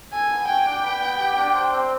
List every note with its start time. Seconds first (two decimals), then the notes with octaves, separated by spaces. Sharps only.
0.13 A4 G#5
0.30 B3
0.48 F#4 G5
0.65 D4
0.83 B4
1.01 B3
1.18 G4
1.37 D4
1.54 C5
1.72 C4